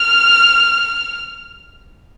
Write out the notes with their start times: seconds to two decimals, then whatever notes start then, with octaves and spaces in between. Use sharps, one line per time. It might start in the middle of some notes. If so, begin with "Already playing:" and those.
Already playing: F6